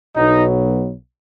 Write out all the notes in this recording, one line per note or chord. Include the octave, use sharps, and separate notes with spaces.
B1 B2 F#3 B3 D#4